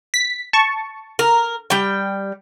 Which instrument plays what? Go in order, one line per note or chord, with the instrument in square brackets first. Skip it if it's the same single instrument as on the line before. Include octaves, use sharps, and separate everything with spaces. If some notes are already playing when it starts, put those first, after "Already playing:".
[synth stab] B6
A5 C#6
[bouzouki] A#4
G3 G5